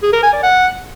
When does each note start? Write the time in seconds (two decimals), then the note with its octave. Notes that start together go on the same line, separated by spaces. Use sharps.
0.03 G#4
0.13 A#4
0.23 G#5
0.33 D5
0.43 F#5